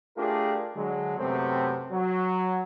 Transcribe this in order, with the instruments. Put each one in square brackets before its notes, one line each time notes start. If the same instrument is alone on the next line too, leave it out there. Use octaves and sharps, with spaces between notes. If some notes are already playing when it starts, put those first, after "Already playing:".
[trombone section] A3 D4 F4 G4 G#4 A#4
D3 F#3 G#3
F#2 C3 A3 B3 C4
F#3